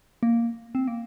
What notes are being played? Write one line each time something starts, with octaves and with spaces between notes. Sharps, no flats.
A#3
C4
A#3